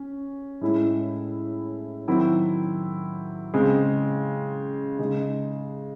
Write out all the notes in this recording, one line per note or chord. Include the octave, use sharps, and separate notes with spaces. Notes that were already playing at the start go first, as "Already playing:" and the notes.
Already playing: C#4
A2 G#3 C#4 E4
D#3 F#3 C4 E4
C#3 G#3 C4
C#3 G#3 D#4